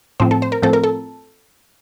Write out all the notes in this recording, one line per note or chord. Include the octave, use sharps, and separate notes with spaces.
A2 F3 C4 C5
A4
C5
A#4
A2 F3 C4 A4
A#4
A4